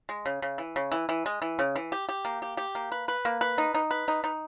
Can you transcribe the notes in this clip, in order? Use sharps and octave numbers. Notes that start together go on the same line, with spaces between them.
G#3
C#3
C#3
E3
C#3
E3
E3
G#3
E3
C#3
E3
G4
G4
A#3
G4
G4
A#3
B4
B4
A#3
B4
D#4
D#4
B4
D#4
D#4